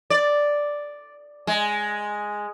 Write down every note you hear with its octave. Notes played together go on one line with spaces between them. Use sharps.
D5
G#3